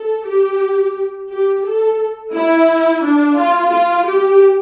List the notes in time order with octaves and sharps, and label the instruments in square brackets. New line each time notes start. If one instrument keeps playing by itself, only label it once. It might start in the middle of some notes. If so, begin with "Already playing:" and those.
Already playing: [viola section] A4
G4
G4
A4
E4
D4
F4
F4
G4